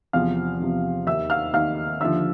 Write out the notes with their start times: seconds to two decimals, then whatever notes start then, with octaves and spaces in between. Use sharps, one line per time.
0.13 E2 C3 F3 F5 F6
0.60 E2 C3 F3
1.06 D#2 D#3 E5 E6
1.30 F5 F6
1.54 D#2 D#3 F5 F6
2.01 D#2 D3 F3 E5 E6